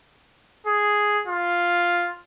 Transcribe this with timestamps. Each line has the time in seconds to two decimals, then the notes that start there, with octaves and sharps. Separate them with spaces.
0.67 G#4
1.27 F4